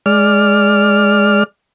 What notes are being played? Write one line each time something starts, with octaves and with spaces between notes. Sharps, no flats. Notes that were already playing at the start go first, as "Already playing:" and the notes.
G#3 D5 F6